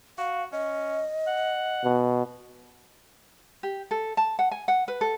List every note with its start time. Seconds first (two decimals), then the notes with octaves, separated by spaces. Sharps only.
0.18 F#4 F5
0.52 C#4 D#5
1.27 F#5
1.84 B2
3.63 G4
3.91 A4
4.17 A5
4.39 F#5
4.52 G#5
4.68 F#5
4.88 B4
5.01 A4